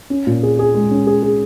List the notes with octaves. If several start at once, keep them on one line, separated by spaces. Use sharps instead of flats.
C#4
A#2
G#4
G#4
G#3
C#4
G#4
G#4